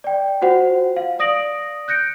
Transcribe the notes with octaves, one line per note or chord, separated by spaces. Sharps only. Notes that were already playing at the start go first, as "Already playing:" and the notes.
D5 G5
F4 F#4 C5 F#5
F5
D5 D#6 A#6 D7 F#7
F#6 G6 A#6 C#7 D7